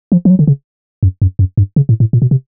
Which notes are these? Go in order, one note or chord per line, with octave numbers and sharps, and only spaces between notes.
F3
F3
F#3
D3
C#3
F#2
F#2
F#2
G2
C#3
A2
A2
A#2
B2
C3